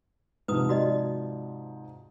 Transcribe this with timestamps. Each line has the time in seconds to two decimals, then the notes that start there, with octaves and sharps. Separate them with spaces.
0.48 G#2 C3 F3 B4 D#6
0.69 F#4 D5 D#5